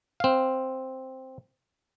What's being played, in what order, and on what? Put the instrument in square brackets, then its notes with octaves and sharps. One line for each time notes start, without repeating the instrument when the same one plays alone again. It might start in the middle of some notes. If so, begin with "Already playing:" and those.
[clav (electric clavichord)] C4 F5